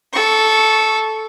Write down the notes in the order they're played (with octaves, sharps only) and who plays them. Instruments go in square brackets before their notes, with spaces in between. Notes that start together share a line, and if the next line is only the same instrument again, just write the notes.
[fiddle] A4 C#6